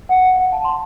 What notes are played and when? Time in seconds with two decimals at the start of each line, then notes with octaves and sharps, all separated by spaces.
0.09 F#5
0.24 F5
0.40 F#5
0.52 A5
0.64 C6